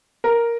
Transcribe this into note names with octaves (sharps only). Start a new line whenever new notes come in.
A#4